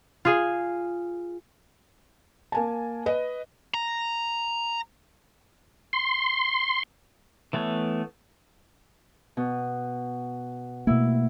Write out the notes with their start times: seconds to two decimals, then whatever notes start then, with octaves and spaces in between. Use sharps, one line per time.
0.25 F4 G#4 G#5
2.52 A#3 G#5 A5
3.06 B4 D#5
3.74 A#5
5.93 C6
7.53 E3 A3 B3 C#5
9.37 B2
10.87 B2 A3 A#3 E4